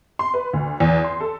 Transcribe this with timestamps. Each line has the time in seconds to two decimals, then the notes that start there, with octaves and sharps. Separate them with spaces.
0.19 C6
0.34 B4
0.53 D2
0.80 E2
1.04 C6
1.21 A4